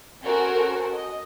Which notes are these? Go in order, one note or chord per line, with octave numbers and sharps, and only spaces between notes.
C#4 F#4 A4 A#4 C5
D#5